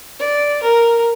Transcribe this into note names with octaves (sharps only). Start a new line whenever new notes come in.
D5
A#4